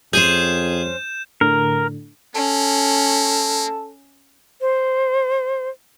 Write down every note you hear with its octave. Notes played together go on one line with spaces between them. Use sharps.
F2 C#4 G#4 C5 G6 E7
A2 D3 A#4
A#3 C#4 A4
C5